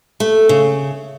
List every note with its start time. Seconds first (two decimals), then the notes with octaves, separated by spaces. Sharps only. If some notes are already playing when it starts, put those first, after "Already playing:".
0.20 A3
0.49 C#3